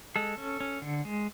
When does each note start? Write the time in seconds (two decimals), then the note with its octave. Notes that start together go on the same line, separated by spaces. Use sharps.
0.16 G#3 A4
0.38 C#4
0.60 C#4
0.82 D3
1.05 G#3